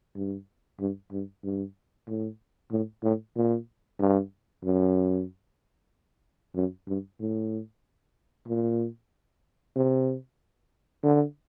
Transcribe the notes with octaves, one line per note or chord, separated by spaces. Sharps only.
G2
G2
G2
G2
A2
A2
A2
A#2
G2
F#2
F#2
G2
A2
A#2
C3
D3